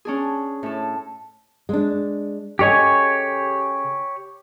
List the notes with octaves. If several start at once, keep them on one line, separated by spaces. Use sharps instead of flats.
C#4 D4 G#4
A2 A4
G#3 D4
C#3 G4 A4 C#5 D#5 G#5